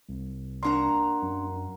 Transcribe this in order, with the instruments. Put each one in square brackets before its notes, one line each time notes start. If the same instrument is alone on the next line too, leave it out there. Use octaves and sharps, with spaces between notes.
[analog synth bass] C2
[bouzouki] A#3 F#5 A#5 [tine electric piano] D4 C6
[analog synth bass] F#2